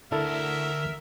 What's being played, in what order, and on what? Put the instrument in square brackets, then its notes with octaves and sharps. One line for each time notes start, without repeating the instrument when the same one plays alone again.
[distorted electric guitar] D2 [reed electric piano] D4 E4 A4 [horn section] A#4 E5